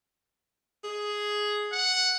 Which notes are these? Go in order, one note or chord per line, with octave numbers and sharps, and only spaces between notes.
G#4
F#5